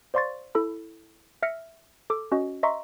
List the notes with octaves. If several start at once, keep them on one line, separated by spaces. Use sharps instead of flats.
C5 D5 F5 C6 C#6 A6
E4 A4 B5
E5 F6 A#6 C#7
A4 D6
C#4 F#4 D#5
D#5 E5 A#5 C6 C#6